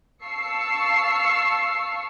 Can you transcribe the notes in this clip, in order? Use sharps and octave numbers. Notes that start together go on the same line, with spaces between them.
F5 A5 C#6 E6 C7 C#7